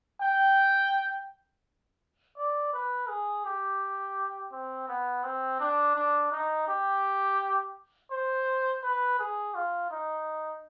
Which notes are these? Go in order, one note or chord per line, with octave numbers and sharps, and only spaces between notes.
G5
D5
B4
G#4
G4
C4
B3
C4
D4
D4
D#4
G4
C5
B4
G#4
F4
D#4